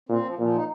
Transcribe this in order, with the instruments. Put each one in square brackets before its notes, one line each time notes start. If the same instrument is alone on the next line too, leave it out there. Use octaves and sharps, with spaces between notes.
[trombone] A#2 [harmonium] C4
[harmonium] F3
[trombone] A#2 [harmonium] F3
[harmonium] D#4